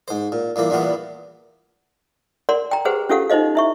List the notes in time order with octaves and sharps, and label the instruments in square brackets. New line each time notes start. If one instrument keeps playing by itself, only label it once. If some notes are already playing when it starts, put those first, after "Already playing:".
[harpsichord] G#2 C5
A#2
G2 A#2 E3 A#3
E2 G2 A#2 E3 B3
[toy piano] A#4 D5 F#5 C6
G5 A#5
G4 G#4 B4 C5 F#5
C#4 F4 G4 A4 F5 F#5
D#4 F4 C5 D#5 F5
E4 E5 C#6